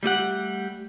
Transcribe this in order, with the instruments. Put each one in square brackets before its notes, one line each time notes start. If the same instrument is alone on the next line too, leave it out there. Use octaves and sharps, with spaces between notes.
[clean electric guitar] G3 A3 G4 F#5